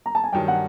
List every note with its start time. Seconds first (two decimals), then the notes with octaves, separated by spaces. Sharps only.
0.06 A#5
0.15 A5
0.24 G#5
0.33 G2 D#3 F#3 G5
0.48 F#5